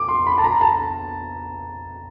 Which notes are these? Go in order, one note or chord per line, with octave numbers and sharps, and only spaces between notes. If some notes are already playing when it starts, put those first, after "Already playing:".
Already playing: D6
C6
B5
A5
A#5
A5